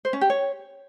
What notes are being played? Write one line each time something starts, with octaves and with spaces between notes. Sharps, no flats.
C5
C#4
G4
C#5